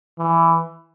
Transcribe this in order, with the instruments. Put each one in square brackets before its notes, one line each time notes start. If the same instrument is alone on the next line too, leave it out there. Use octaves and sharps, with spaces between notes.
[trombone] E3